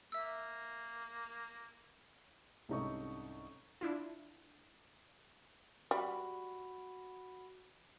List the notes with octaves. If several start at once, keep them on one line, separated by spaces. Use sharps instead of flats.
A#3 E5 E6
C2 G#2 C#4 D#4 A4 C#6
D4 E4 F4
G3 F#4 B5